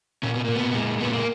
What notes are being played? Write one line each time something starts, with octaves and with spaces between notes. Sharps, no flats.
A#2 C#4
B3
A#2 A#3
B3
A#2 G#3
A#2 B3
A#3